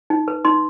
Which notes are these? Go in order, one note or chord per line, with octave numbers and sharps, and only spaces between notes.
D#4
B4
D#4 C6